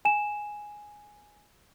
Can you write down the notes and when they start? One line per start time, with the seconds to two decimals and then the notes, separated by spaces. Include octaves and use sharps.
0.05 G#5 E7